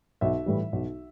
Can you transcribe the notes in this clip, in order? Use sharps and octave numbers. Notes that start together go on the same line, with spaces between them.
B1 E5
A2 E3 G3
B1